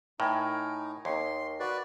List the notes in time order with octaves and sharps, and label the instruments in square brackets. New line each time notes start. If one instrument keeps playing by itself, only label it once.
[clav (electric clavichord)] A2 [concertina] D#4 [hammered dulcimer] A#4 G#5 [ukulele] G5
[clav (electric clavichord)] D#2 [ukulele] D#4 C#5 [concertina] C6
[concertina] F#4 B4 D5